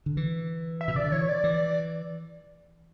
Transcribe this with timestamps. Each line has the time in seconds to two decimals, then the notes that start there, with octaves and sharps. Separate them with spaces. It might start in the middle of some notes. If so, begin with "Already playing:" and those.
0.06 D3
0.17 E3
0.81 E5
0.88 B2
0.95 C#3 D5
1.04 D3
1.12 E3 C#5
1.29 D5
1.44 E3